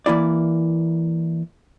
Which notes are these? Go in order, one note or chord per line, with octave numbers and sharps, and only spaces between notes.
E3 A#3 E4 D5